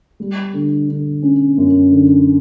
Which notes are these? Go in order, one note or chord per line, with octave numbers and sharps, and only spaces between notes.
G3
D3
D3
C#4
F#2
D3